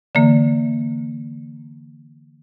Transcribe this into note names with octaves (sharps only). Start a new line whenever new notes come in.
D3 E3 A#3